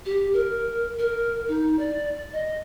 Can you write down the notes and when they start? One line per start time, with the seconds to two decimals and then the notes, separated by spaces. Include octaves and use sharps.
0.06 G4
0.34 A#4
0.99 A#4
1.48 D#4
1.79 D5
2.33 D#5